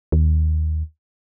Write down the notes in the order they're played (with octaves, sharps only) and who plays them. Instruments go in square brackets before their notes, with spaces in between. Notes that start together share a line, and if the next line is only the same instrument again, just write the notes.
[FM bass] D#2